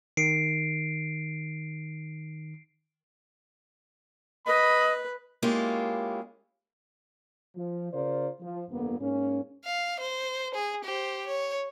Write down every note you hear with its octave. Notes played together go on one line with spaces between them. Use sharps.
D#3 C7 D7
B4 D#5 B5
G#3 A#3 C#4 E4 F4 G4
F3
C#3 F4 A#4 C5 D5
F3
G1 F2 D3 A#3 B3
G#2 A#3 C#4
F5
C5
G#4
G4 C5
C#5